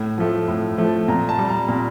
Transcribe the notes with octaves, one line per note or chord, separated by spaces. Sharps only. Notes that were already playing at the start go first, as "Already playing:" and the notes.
Already playing: A2
F3 A3
A2
F3 A3
A#2 A#5
A5
G3
A#5
A#2 A#5